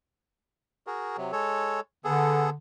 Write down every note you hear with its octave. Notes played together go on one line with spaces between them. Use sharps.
F#4 G#4 A#4
C3 F#3
G#3 A4 C#5
D3 B3 G#4 A4